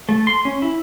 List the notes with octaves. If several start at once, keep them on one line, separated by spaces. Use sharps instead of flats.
A3
C6
C#4
E4